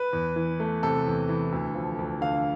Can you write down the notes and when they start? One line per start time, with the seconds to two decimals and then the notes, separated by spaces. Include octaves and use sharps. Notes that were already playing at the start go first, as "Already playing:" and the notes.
Already playing: B4
0.13 E2
0.36 E3
0.60 A3
0.83 C3 A4
1.06 E2
1.29 E3
1.52 D2
1.75 F3
1.99 D2
2.21 D3 F5